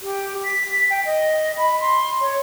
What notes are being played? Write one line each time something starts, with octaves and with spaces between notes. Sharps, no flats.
G4
B6
G5
D#5
B5
C6
C#5